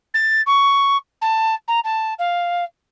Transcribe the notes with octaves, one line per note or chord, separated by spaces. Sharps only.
A6
C#6
A5
A#5
A5
F5